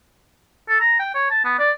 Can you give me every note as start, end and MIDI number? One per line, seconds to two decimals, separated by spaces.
0.69 0.80 69
0.80 0.95 82
1.00 1.14 79
1.15 1.26 73
1.31 1.43 81
1.45 1.56 59
1.59 1.71 74